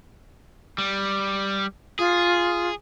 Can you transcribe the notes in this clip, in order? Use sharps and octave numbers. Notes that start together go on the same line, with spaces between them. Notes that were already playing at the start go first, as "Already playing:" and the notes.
G3
F4 G#4